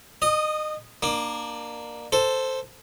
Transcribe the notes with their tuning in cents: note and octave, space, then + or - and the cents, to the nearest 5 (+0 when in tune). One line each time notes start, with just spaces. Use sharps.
D#5 -25 D#6 +0
A#3 +10 D4 +30
A4 +5 C5 +0